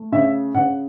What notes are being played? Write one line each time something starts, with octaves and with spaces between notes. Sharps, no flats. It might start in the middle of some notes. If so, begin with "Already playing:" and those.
Already playing: A3
C#3 E5
C#3 F#5